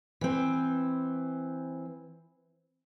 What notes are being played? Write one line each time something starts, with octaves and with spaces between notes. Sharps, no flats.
E3 C4